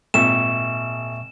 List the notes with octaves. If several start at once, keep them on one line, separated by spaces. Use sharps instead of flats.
G#1 A#2 E5 C#6 E7